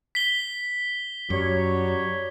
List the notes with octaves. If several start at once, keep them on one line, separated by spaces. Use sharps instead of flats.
B6 G7
F#2 F#3 G3 G4 C#5